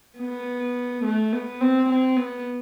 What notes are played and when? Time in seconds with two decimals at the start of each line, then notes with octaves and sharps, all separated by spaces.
0.19 B3
1.04 A3
1.33 B3
1.61 C4
1.89 C4
2.17 B3